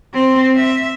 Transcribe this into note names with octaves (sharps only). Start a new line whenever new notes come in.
C4
E5